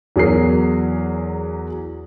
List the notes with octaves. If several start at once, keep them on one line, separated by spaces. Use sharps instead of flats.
E2 F#3 G#4 A#4 C7